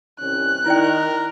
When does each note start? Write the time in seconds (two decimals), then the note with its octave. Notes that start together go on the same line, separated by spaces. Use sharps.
0.20 C2 D#3 C#4 F#6
0.66 D#3 E4 A#4 D5 G5